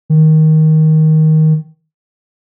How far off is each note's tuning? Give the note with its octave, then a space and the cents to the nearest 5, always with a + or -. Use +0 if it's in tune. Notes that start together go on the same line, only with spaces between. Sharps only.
D#3 +10